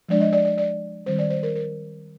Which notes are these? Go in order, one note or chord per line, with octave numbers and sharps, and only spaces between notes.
F3 G#3 D4 D5
D#5
D5
D5
D5
D#3 G3 C4 C5
D5
C5
A#4
A#4